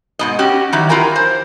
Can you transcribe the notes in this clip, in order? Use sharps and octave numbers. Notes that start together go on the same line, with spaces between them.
G#2 B2 D#5
C#4 F#4 G4
D#3 E3 F#3
E4 F4 G4 A#4 G#5
C5